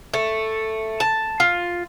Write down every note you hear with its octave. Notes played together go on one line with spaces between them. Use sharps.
A3
A5
F4